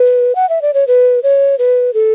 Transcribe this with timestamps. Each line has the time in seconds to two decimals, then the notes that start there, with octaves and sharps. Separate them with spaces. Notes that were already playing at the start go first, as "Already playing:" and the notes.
Already playing: B4
0.35 F#5
0.49 E5
0.62 D5
0.74 C#5
0.87 B4
1.23 C#5
1.59 B4
1.94 A4